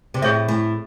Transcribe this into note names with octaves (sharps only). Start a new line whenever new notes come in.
C3
A2 G#4 C#5 E5
A2